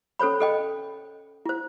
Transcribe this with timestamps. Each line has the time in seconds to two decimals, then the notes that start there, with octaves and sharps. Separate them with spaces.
0.19 C#4 A4 C5 C#5 B5
0.40 A4 D#5 G5
1.46 E4 C5